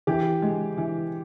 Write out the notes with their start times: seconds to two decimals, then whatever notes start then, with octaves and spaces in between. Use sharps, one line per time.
0.07 E3 G4
0.42 G#3
0.78 E3